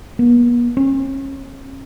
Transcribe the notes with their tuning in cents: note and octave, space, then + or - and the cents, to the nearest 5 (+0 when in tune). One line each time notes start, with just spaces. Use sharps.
B3 -45
C#4 -40